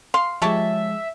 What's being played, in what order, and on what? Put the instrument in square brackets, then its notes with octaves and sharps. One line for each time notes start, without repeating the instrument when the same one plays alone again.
[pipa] F5 C6
[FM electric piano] F3 G#3 [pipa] G4 C#5 A5 [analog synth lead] E5